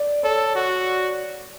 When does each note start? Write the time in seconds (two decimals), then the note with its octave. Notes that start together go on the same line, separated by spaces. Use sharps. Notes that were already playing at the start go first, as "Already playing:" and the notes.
Already playing: D5
0.23 A4 C#5
0.55 F#4